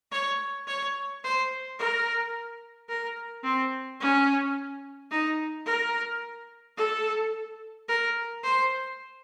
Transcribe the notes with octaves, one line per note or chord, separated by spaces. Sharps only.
C#5
C#5
C5
A#4
A#4
C4
C#4
D#4
A#4
A4
A#4
C5